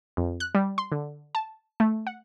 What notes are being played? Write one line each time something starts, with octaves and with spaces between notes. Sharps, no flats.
F2
F#6
G3
C6
D3
A5
A3
F#5